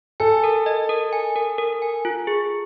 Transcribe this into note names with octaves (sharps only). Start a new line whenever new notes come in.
A4 G#5
A#4
D#5
A#4
G#5
A#4
A#4
G#5
F4
G#4